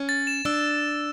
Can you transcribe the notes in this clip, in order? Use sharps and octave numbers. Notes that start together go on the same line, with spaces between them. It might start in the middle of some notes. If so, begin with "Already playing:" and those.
Already playing: C#4
A6
E7
D4 E6